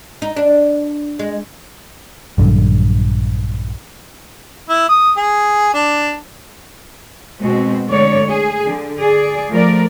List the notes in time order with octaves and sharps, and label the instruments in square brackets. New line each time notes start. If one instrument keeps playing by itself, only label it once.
[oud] D#4
D4
G#3
[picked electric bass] A#1 G2 D3 F#3
[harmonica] E4
D#6
G#4
D4
[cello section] B2 G#3 C4 F#4
D3 G#3 A3 C#5 D5
G#4
D3
G#4 D5
F3 A3 A#4 D5